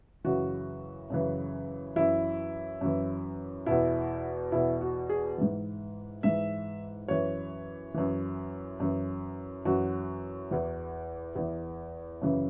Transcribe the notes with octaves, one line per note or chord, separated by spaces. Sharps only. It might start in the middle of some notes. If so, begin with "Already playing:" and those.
F#2 C#3 E3 F#4
F#2 C#3 E3
F#2 E3 E4
F#2 E3
E2 B2 E4
E2 B2 E4
F#4
G#4
G#2 E3
G#2 E3 E5
F#2 E3 C#5
F#2 E3
F#2 E3
F#2 E3 F#4
E2 E3
E2 E3
F#2 C#3 E3